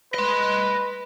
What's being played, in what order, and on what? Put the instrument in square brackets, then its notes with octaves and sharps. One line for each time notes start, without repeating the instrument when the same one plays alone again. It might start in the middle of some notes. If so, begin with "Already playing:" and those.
[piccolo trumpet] B4 [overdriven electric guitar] D#5 C6